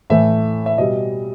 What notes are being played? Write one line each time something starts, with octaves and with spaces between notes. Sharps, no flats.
A2 E3 A3 E5
E5
B2 G3 D#5